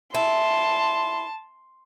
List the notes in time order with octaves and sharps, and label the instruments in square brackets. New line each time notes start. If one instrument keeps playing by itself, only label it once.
[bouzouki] E4 [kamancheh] A5 [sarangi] C6